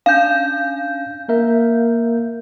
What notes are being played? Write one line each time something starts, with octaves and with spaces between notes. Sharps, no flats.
C#4 D4 F5 G#5 G6
A#3 A#4 E5